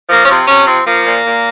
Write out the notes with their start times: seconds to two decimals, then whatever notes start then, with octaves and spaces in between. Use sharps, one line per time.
0.10 F3 A#3
0.25 C#4
0.29 C3 C4
0.48 C3 C#4
0.67 F3 C4
0.86 F3 A#3
1.05 A#2
1.24 A#2